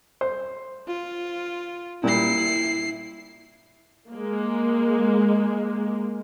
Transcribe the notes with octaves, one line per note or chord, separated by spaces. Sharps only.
C5
F4
A#2 G3 E4 C7
G#3 A#3